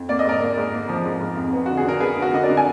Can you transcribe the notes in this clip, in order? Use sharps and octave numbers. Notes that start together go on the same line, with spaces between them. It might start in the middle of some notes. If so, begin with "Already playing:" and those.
Already playing: F2
A#3 D5
D#5
G#2 A#4 D5
A#3
G#2
A#3
F3
G#2
G#2
F2
B3
D3 F#4
G#4
D3 A#4
B3 G#4 B4
D3
F#4 A#4
D3 D#5
A#4 D5
D3
G#5